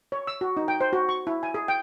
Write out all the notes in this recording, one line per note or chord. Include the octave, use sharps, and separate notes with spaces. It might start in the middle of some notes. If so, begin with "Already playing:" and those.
C#5
E6
F#4
D#4
G5
C5
F#4
C#6
E4
G#5
G#4
G5